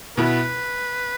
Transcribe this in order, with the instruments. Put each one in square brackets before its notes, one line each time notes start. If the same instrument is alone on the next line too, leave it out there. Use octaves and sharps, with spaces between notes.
[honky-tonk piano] B2 B3 E4 [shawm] B4